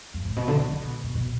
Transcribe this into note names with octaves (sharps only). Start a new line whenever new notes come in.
G2
A2
B2
D3
D3
D3
B2
B2
B2